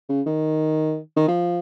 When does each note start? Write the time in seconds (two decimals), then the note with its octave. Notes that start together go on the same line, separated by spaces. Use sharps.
0.09 C#3
0.26 D#3
1.16 D#3
1.28 F3